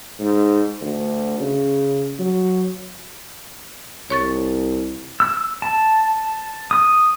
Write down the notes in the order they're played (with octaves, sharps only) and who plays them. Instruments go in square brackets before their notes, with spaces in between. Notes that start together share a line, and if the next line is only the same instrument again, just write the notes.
[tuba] G#2
D2
C#3
F#3
[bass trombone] C2 [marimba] C#5 C#6 A6
[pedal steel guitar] E6
A5
D#6